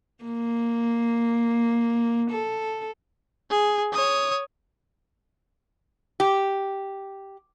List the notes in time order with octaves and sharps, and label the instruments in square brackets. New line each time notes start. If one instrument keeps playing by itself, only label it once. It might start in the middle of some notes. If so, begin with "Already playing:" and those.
[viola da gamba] A#3
A4
[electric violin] G#4
C#5 D#6
[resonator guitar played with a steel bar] G4